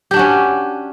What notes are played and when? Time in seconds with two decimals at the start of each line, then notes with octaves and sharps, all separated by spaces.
0.11 G4
0.14 D4
0.16 F#4
0.19 C#4